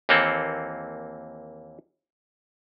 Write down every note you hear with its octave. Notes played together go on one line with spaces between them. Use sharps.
D#2 E3 A#3 C4 A4